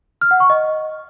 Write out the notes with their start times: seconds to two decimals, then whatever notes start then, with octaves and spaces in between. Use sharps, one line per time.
0.21 F6
0.31 F#5
0.40 C#6
0.50 D#5